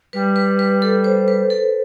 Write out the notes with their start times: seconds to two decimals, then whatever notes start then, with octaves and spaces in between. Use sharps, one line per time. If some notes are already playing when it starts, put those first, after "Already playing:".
0.13 G3 B4
0.36 B4
0.59 B4
0.82 A4
1.04 C5
1.28 B4
1.50 A4